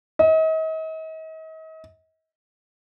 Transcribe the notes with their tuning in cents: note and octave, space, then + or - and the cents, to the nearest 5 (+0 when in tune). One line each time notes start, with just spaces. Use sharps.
D#5 +40